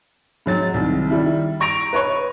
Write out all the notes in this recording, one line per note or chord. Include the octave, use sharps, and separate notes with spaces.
G#2 F#3 A6
C2 D#3
D#3 G3 E4
A#5 C#6 A#6 D7 F7
B4 C#5 C#6